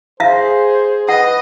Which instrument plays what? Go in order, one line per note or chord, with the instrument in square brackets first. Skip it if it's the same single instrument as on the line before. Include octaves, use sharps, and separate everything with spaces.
[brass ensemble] G#4 [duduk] C5 [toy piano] E5 F5
[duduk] B4 [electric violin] D#5 [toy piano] F#5